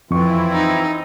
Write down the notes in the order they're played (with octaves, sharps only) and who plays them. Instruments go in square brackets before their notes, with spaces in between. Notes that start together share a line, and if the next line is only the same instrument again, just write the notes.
[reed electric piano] F2 C#6 [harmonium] E3 C4 F4 [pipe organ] E4
[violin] D#4